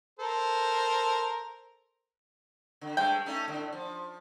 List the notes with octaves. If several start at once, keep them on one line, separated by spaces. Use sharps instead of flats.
A4 A#4 C5
D3
G2 G#3 A3 G5
A3 C#4 D#4
A2 D3
F3